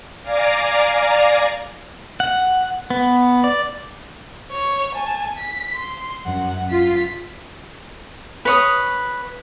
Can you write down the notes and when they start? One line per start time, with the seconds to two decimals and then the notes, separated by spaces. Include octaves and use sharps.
0.22 D5 F5 G#5 A#5 D6
2.20 F#5
2.90 B3
3.44 D5
4.52 C#5 C#6
4.95 G#5 A5
5.37 B6
5.75 C6
6.25 F#2 F#5
6.71 F4 B6
8.45 B4 C#5 D#6